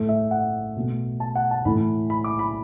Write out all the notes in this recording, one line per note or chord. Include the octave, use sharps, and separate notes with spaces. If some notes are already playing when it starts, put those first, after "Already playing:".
Already playing: A2 A3
E5
F#5
B2 A3
A5
F#5
A5
A2 E3 A3 B5
B5
D6
B5